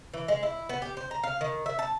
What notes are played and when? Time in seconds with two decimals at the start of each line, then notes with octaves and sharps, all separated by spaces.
0.14 E3
0.28 G#3
0.43 E4
0.69 B3
0.82 G4
0.97 C5
1.11 A#5
1.23 F5
1.41 D#3
1.66 E5
1.79 A5